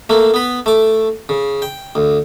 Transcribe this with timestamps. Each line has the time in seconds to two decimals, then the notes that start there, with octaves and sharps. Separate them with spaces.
0.09 A3 A#3
0.34 B3 B4
0.66 A3 D6
1.29 C#3
1.62 G5
1.95 D2